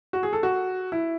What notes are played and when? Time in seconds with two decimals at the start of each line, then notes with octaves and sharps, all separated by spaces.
0.13 F#4
0.23 G#4
0.33 A4
0.43 F#4
0.92 E4